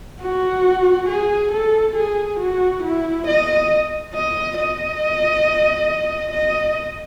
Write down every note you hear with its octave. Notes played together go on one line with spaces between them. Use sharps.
F#4
G#4
A4
G#4
F#4
E4
D#5
D#5
D#5
D#5